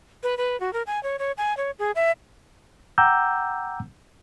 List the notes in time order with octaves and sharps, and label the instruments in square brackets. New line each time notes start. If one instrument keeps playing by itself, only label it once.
[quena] B4
B4
F#4
A#4
G#5
C#5
C#5
G#5
C#5
G#4
E5
[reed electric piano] F#5 G5 A#5 D6 E6 G6